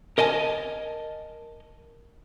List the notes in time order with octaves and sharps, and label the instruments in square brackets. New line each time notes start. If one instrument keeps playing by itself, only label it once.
[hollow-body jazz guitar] A#4 D#5 G#5 A5